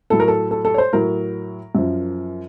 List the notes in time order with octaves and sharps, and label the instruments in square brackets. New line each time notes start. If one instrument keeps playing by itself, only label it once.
[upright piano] A2 F#3 A4
A#4
A4
A4
A4
C#5
C5
A2 F#3 A#4
F#2 F3